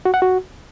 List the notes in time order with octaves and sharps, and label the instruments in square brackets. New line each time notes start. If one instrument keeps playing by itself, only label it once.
[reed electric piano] F#4
F#5
F#4